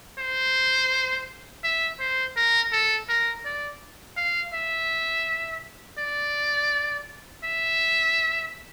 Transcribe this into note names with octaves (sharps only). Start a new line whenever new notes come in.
C5
E5
C5
A#4
A4
A#4
D5
F5
E5
D5
E5